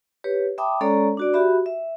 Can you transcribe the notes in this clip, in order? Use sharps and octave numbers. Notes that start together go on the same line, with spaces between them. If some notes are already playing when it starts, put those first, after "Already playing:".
G4 B4 C#5
E5 G5 A5 B5 D6 D#6
G#3 C#4 A4 C#5 D5 A#5
D4 F#4 D5
F#4 G4 E5 B5
E5